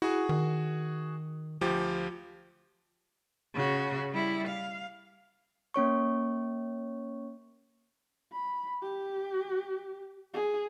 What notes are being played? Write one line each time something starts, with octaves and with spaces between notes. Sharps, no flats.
E4 F#4 G#4
D#3
D2 F3 G4
C#3 F#4
G3 E4
F5
A#3 C#4 C#5 C#6
B5
G4
G#4